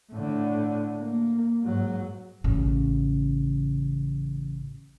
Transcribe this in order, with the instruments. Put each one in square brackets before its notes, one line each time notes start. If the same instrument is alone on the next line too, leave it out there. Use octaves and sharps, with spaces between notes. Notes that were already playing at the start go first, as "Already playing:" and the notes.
[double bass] A2 D3
A#3
G#2 F#3
[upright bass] A1 C#3